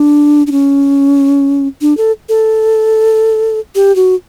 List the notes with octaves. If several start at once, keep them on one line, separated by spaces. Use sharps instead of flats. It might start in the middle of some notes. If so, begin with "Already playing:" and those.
Already playing: D4
D4
C#4
D4
A4
A4
G4
F#4